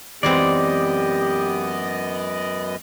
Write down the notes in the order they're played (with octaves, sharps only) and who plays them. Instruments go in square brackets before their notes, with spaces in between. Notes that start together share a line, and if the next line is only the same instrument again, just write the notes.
[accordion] F#2 B3 D#5 [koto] E3 G#3 C4 [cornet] G4 [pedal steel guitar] D5